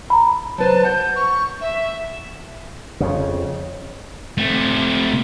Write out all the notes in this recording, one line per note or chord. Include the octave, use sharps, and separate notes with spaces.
A#5 B5
F#3 B4 C5 A5
F#5 G6
C#6
E5
F2 C#3
C3 A3